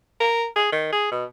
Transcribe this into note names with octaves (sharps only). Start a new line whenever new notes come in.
A#4
G#4
D#3
G#4
B2